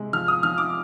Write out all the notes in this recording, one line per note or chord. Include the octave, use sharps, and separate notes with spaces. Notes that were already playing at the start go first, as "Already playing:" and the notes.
Already playing: C3 G#3
F3 F6
D#6
F3 F6
D6